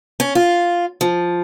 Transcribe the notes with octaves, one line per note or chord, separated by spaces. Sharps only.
C#4
F4
F3